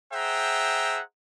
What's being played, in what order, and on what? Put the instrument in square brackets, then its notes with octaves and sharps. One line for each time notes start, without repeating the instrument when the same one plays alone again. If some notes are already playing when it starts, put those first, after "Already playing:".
[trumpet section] G#4 C5 E5 F#5 G5 A#5